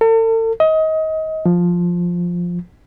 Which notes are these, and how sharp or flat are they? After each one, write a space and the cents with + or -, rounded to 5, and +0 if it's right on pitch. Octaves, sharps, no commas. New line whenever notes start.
A4 +40
D#5 +25
F3 +5